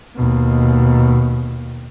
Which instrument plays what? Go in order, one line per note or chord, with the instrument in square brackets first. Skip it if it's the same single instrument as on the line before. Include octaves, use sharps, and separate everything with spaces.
[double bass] D#2 B2